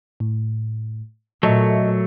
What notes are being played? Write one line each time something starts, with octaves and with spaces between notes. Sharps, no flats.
A2
A#2 F#3 A3 A4 D#5 E5